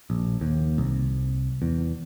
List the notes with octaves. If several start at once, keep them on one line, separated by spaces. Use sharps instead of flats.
A#1
D#2
C2
E2